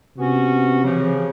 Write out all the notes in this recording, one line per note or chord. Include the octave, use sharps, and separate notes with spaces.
C3 B3 C#4 F#4
C#3 E3 F3